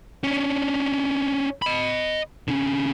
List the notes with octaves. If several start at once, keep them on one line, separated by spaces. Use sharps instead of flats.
C#4 D4
D#5 B5
D3 C#4